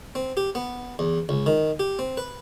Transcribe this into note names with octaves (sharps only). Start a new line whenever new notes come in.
C4
G4
B3
E2
C#2
D#3
G4
C4
B4